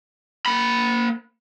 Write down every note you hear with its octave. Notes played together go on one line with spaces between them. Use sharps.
A#3 B5